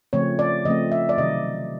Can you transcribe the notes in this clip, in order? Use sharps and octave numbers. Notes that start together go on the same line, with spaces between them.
C#3 F3 A3 C4 C#5
D5
C#3 F3 A3 C4 D#5
E5
D5
C3 D#3 F#3 D#5